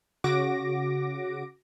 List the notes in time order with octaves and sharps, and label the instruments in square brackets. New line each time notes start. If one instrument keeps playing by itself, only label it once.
[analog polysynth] C#3 F#4 D6 A#6 D7